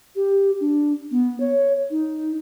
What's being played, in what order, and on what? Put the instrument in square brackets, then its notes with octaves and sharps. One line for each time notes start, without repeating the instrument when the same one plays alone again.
[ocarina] G4
D4
B3
C#5
D#4